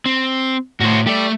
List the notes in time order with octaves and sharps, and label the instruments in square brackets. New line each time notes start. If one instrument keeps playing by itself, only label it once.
[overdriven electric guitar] C4
[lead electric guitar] A2 [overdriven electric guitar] F#4 C5
[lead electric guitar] A3 [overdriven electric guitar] G4 D5